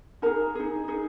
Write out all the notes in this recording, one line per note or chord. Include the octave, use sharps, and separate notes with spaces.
D#4 G#4 A#4 A#5
D#4 G#4
D#4 G#4